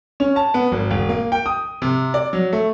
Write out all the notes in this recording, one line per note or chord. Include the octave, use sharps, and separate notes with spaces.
C#4
A5
B3
G#1
E1
A#3
G5
D#6
C3
D5
F#3
A3